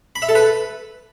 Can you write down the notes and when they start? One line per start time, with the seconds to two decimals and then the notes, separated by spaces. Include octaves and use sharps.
0.16 B5
0.22 E5
0.29 A4
0.35 B4